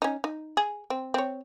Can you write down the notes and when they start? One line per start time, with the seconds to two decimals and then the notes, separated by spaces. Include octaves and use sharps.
0.02 C#4 D#4
0.24 D#4
0.57 G#4
0.90 C4
1.14 C4 C#5